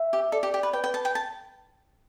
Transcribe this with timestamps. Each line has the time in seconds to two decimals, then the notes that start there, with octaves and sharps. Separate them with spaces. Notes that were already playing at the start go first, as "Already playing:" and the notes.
Already playing: E5
0.13 G4
0.32 A4 D5
0.43 G4
0.54 G4
0.63 B4
0.73 B4 G5
0.84 G5
0.94 A5
1.05 G5
1.15 A5